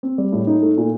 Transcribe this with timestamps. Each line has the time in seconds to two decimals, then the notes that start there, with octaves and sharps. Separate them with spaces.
0.03 C4
0.18 G3
0.32 A2
0.47 D#4
0.62 A3
0.77 A#2